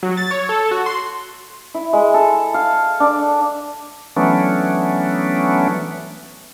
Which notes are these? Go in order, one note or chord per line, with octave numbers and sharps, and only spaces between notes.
F#3
A6
C#5
A4
F#4
C6
E4
G#3
A4
F5
D4
E3 F#3 A3 B3 C#4 D4